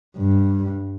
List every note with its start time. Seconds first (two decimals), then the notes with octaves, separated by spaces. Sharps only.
0.17 G2